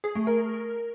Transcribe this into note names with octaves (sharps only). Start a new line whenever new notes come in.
G#4
A3
A#4